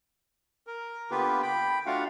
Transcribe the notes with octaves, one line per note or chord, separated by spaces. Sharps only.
A#4
D3 A#3 B3 F4 G4 B4
G5 B5
A3 D4 F4 F#4 F5 F#5